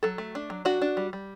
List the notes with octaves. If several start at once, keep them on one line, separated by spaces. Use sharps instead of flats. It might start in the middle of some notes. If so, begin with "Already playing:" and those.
F#3 A4
A3
D4
F#3
D4 F#4
D4
G3
G3